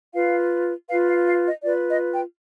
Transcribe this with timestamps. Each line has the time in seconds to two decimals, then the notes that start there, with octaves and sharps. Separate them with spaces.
0.14 F4 B4 F5
0.88 F4 B4 F5
1.08 F5
1.26 F5
1.45 D#5
1.63 F4 B4 D5
1.89 D#5
2.13 G5